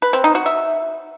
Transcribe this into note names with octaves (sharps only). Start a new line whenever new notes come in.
B4
C4
D#4
F#4
E5